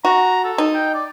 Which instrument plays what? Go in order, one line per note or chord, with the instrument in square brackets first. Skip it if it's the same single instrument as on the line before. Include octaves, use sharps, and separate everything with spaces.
[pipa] F#4 [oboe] A#5
[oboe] A4
[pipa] D#4
[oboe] G5
D5